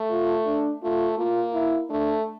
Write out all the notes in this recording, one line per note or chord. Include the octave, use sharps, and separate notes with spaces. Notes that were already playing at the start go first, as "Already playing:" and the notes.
Already playing: A3
F4
D4
A3 F4
A#3 F4
E4
A3 D4